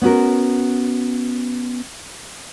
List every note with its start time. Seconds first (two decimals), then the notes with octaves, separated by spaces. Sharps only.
0.01 B3 C#4 F#4 A#4